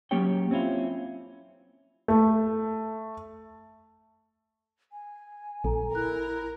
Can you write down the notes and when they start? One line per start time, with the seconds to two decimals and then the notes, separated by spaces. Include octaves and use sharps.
0.11 F#3 A#3 C#4 G4 C#5 G5
0.51 C4 C#4 E4 F4
2.08 A3
4.92 G#5
5.64 A#1 A4 A#5
5.95 E4 A#4 F#6